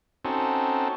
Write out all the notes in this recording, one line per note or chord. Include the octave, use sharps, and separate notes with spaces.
C4 C#4 D#4 F#4 A4